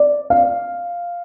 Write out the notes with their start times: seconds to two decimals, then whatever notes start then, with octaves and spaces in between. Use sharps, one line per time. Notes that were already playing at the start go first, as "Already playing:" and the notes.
Already playing: D5
0.30 F5